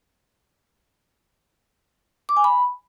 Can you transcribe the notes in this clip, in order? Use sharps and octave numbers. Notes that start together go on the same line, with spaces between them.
D6
G#5
B5